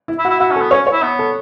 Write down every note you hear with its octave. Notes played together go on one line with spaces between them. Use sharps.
E4
E4
F#4
E4
E4 F#4
C#4
A4
B3
C#4 C#5
C#5
E4
B3
A4